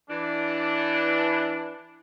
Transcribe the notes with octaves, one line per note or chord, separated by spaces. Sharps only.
E3 D4